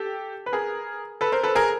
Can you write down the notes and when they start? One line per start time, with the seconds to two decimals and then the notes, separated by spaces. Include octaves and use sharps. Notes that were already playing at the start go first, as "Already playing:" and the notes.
Already playing: G4 A4
0.46 B4
0.53 G#4 A#4
1.21 A4 B4
1.32 A#4 C5
1.43 A4 B4
1.55 G#4 A#4